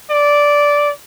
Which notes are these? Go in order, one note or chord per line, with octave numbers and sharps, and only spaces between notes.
D5